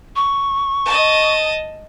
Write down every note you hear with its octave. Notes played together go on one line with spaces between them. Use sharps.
C#6
D#5 A5